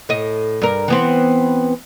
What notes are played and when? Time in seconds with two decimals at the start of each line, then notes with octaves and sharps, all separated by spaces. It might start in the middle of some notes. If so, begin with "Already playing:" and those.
0.09 A2 D#5
0.62 G2 A#4
0.88 E3 B3 C4